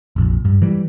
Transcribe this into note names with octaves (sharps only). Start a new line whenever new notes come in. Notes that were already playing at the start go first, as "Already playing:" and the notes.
F1 A#1
G2
E3 G3